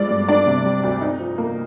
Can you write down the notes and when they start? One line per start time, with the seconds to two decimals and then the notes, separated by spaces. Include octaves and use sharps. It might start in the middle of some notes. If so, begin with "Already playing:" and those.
Already playing: G2 F3 G#3 D5
0.10 G2
0.29 D4 D5
0.47 C3
0.65 G3
0.83 D2
1.01 D#4
1.19 F3
1.38 A#3